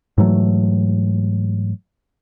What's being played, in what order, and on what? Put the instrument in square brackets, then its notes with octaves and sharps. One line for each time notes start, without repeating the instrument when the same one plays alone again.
[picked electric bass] G#2 E3 F#3 A3